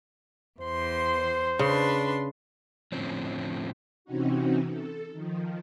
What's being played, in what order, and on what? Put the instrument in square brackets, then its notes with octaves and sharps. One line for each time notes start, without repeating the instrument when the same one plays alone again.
[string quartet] E2 C6 [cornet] C5
[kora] C#3 [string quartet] D4 B4 C6
[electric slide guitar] A2 D3 F3 C4 C#4
[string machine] C3 E3 C4 C#4 D#4 F#4
A4
D#3 F3